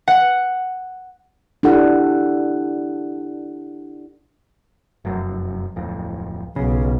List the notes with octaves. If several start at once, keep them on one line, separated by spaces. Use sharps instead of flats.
F#5
D4 E4 G4 A4 F#5
F1 F#2
D1 F2
B1 C#3